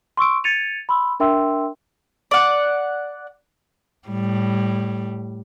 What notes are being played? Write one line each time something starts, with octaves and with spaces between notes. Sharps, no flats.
C6 C#6 E6 D7
G#6 A6 C#7 D#7 F7
B5 C6 E6
D4 A#4 E5 G5 C6 E6
D5 F#5
A2 G3